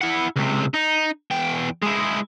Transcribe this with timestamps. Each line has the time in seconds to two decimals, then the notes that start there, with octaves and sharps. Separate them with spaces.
0.01 E4 F#5
0.36 C#2 C3
0.74 D#4
1.31 E2 G5
1.83 G#3 E4